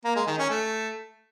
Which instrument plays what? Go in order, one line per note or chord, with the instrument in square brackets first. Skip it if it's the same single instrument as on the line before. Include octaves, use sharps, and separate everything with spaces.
[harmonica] A#3
G#3
D#3
C#4
A3